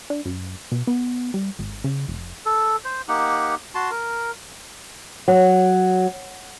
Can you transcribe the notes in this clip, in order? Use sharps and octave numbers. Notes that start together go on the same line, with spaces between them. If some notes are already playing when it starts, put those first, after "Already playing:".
D4
F#2
B2
B3
G3
G#1
C#3
F1
A4
C5
A#3 D#4 G4 F#5
F#4 A5 C6
A#4
F#3